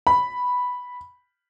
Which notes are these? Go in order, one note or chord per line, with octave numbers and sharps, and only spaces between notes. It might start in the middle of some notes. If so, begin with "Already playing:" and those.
B5